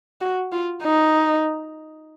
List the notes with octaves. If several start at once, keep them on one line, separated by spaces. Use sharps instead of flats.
F#4
F4
D#4